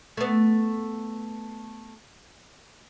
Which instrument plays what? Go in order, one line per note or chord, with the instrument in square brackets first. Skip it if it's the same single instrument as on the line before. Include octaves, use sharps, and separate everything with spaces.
[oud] A3 B3